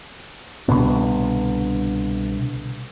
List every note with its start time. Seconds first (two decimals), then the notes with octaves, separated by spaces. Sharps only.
0.68 C2 B2 D3 B3